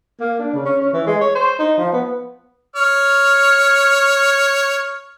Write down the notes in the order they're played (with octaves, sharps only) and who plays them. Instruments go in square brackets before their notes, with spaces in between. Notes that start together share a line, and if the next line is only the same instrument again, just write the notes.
[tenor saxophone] A#3
D4
C#3
C#4
C#4
E3
G#3
C#5
C5
D#4
F3
B3
[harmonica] C#5 F6